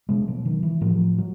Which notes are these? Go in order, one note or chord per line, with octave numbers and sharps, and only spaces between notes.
B2 G#3
F#3
D#3
E3
A2 F3
F#3